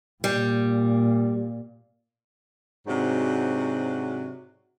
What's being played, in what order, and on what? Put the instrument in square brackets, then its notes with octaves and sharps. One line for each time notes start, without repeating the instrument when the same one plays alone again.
[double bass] A#2 [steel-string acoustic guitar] G3
[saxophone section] G#2 C3 F#3 D4 F#4